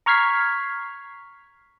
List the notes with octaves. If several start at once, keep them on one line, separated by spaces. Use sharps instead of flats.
A#5 C#6 F6 G#6 B6 C7